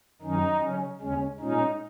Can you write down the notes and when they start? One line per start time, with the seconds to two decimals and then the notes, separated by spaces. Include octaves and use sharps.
0.21 F#2 D#3 F#3 C#4 D#4
0.61 C#3 F#3 C#4
1.00 D#2 C#3 G#3 C#4
1.39 A#2 G#3 C#4 D#4